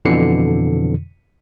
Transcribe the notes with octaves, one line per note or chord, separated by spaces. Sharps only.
F2 B2 D3 E3 C7 C#7